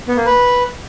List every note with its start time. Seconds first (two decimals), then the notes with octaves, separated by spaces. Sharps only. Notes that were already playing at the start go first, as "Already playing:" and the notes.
0.08 B3
0.17 A#3
0.26 B4